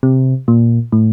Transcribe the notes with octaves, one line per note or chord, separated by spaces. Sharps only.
C3
A#2
A2